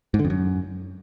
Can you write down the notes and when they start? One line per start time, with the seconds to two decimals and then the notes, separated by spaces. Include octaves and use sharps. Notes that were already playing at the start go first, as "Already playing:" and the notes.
0.14 G#2
0.19 D3
0.25 F2
0.30 F#2